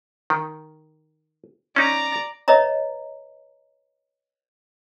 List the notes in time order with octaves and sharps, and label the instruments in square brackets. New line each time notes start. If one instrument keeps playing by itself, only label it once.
[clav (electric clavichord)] D#3
[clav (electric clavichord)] C#4 D#4 [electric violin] D5 A#5
[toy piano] B4 C#5 D#5 E5 A#5